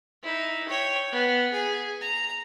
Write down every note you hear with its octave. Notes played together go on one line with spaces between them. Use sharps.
D#4 E4
C#5 G5
B3
G#4
A#5